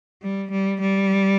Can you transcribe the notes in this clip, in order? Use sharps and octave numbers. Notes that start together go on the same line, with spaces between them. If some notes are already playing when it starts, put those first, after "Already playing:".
G3
G3
G3